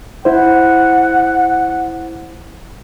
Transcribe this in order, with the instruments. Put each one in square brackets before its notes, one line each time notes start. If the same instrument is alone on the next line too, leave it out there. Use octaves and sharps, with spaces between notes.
[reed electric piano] E4 C5 [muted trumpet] F#5